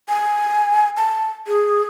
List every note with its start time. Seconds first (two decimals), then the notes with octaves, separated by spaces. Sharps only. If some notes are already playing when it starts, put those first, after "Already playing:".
0.08 G#5
0.97 A5
1.47 G#4